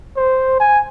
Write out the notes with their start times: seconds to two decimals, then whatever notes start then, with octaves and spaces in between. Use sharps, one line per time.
0.17 C5
0.60 G#5